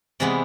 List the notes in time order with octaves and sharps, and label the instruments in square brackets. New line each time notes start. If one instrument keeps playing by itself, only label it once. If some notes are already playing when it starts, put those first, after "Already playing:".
[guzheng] C3 E3 G#3 B3